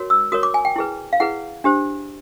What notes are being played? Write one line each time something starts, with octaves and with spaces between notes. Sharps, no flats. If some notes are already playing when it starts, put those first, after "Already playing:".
Already playing: F#4 A#4 C#5
E6
F#4 A#4 C#5 D#6
D6
G#5
G5
E4 G#4 B4
F5
E4 G#4 B4 F#5
D4 G4 C5